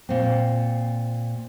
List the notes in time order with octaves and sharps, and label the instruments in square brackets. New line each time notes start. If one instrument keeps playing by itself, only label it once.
[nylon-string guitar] A#2 C4